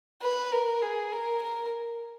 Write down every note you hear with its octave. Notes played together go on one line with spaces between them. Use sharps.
B4
A#4
G#4
A#4
A#4